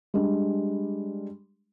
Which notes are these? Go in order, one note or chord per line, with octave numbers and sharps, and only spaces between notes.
G3 G#3 D4